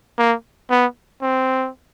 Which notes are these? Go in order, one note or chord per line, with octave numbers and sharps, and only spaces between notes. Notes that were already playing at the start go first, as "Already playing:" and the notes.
A#3
B3
C4